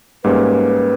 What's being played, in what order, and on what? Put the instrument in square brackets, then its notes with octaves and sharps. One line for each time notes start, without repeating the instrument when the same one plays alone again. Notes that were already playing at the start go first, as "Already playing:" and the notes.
[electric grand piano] G#2 G3 A#3 C#4 [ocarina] B4